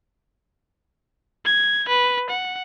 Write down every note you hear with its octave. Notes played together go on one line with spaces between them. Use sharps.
G#6
B4
F#5